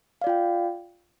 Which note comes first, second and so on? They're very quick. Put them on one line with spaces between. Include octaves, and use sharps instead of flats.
F5 D5 F4 G5